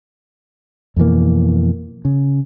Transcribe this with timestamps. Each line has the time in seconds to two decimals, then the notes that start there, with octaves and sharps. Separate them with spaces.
0.96 F2 B2 E3 A#3
2.05 C#3